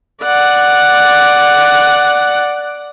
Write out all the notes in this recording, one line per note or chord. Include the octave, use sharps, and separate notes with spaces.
D5 F#5